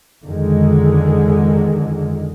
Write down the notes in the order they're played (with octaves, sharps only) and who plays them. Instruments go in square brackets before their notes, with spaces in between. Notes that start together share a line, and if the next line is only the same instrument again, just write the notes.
[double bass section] F2 D3 D#3 G#3